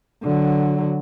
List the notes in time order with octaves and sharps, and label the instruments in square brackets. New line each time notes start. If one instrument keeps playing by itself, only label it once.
[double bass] D3 F#3